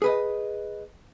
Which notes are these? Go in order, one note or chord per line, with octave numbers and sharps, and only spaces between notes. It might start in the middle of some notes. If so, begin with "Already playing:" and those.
G#4 B4 D#5